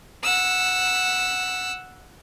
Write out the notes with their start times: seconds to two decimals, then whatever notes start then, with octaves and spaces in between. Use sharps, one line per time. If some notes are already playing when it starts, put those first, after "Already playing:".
0.23 F#5 E6